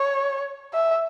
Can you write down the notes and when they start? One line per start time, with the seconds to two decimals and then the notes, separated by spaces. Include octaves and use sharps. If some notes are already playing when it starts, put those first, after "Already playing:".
Already playing: C#5
0.74 E5